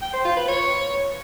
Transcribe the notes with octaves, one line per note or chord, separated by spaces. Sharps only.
G5
C5
F4
B4
C#5